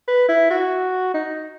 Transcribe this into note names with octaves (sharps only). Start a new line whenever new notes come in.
B4
E4
F#4
D#4